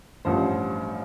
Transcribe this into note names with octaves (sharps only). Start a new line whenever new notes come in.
A1 G2 F3 C5